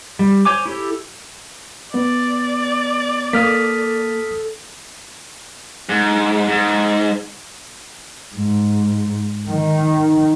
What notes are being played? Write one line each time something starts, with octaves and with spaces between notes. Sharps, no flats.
G3
C5 C#5 G#5 D6
E4 G4 A4
B3 D5
A#3 A4 D#6 F6 B6
G#2
G#2
G#2
D#3